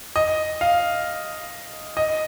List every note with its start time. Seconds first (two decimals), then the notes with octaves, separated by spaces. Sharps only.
0.16 D#5
0.61 F5
1.97 D#5